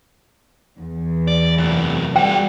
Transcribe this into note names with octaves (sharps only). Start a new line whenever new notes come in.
E2
D5
F#2 C3
G3 F#4 G#4 G5